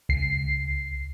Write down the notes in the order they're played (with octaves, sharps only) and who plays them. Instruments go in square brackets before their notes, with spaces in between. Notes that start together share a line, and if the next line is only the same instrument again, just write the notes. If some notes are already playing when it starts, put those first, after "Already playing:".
[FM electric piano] C#2 C7